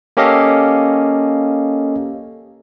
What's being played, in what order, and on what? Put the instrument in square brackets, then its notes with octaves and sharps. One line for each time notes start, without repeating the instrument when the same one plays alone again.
[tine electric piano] A#3 C#4 G4 A4 D#5 F5